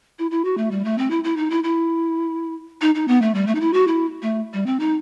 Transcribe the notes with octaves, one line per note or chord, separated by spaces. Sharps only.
E4
E4
F#4
A3
G3
A3
C4
E4
E4
D#4
E4
E4
D#4
D#4
B3
A3
G3
A3
D#4
E4
F#4
E4
A3
G3
C4
D#4